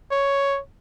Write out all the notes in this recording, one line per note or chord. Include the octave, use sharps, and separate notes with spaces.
C#5